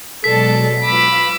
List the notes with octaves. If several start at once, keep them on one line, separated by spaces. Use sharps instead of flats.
B2 F#3 G#3 A4 D5 A5 B6
F4 B4 B5 D6 E6 F6